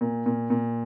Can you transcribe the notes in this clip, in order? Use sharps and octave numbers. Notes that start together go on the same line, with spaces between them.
A#2
A#2
A#2